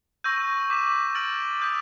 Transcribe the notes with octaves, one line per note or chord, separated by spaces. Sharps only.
C#6 E6 G6 A#6 D#7
D6 G6 B6 E7
F6 A6 D7 F#7
D#6 G6 B6